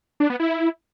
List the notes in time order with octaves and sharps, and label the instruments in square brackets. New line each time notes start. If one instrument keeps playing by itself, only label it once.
[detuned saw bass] D4
B3
E4